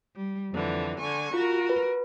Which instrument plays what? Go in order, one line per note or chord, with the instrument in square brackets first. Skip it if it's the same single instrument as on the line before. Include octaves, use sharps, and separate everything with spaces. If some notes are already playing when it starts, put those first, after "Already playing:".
[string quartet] G3
F2 D3 E3
D3 G#5 C#6
[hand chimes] F4 [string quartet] F#4 A#4
[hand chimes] B4